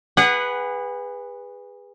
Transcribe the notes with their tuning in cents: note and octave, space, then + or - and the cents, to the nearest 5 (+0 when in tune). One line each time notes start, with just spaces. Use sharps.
G#4 -30 B4 +0 F#5 +10